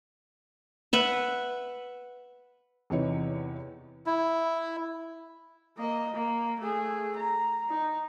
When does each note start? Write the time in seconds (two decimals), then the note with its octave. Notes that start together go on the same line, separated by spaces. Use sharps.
0.93 B4 E5 F#5
2.90 E2 C3 E3 D#4 C#5
4.06 E4
5.77 A#3 D#5
6.14 A#3
6.60 A3 G#4
7.16 A#5
7.69 D#4